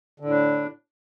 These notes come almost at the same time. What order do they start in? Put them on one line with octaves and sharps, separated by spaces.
D3 A2 D4